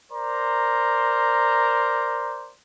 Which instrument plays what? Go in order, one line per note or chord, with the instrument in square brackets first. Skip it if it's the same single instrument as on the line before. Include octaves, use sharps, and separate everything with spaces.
[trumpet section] A#4 C5 D5 A#5